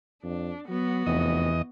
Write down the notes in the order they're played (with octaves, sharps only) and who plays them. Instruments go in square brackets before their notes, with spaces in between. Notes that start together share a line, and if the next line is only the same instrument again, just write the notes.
[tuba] F2 [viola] D4
[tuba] F#3 [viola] B3 F#4
[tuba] F1 [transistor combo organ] E2 D#5